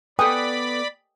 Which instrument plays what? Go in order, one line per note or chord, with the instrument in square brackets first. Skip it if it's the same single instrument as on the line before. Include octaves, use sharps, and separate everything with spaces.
[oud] B3 A4 [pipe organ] D5 B5 [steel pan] G5 G#5 D#6